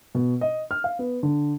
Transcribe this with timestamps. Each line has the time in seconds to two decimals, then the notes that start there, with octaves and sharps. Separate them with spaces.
0.15 B2
0.41 D#5
0.71 F6
0.84 F5
0.99 B3
1.23 D3